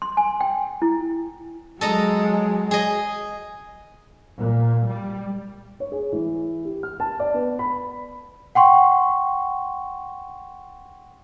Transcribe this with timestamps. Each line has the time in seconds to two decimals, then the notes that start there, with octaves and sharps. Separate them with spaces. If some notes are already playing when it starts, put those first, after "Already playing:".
0.02 C6
0.17 G#5
0.41 G5
0.82 E4
1.81 F#3 G#3 A4 D#5 A#5
2.71 G#4 D#5
4.36 A#2
4.86 G3
5.80 C#5
5.92 G#4
6.12 E3
6.65 G4
6.83 F6
7.00 A5
7.19 D5
7.34 B3
7.59 B5
8.55 F#5 G5 C6 C#6